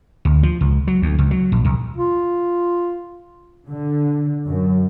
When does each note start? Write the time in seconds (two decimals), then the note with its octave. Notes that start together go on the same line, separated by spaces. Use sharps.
0.25 D2
0.43 F3
0.61 C#2
0.87 F#3
1.02 D2
1.19 C#2
1.31 F#3
1.52 A#1
1.65 C2
1.96 F4
3.68 D3
4.47 F#2